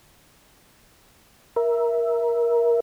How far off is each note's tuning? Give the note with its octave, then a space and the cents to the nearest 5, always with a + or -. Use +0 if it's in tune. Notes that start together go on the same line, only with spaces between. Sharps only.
A#4 +15 E5 +0